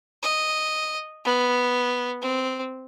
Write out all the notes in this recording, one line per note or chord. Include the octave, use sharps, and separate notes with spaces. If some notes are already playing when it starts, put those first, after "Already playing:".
D#5
B3
C4